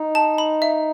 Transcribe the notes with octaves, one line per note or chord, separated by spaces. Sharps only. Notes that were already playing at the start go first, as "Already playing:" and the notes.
Already playing: D#4
A5
B5
E5